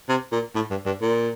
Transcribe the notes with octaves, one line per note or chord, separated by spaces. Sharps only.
C3
A#2
A2
G2
G2
A#2